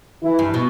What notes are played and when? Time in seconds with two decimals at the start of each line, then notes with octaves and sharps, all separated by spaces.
0.23 E3 E4
0.39 G2
0.54 B2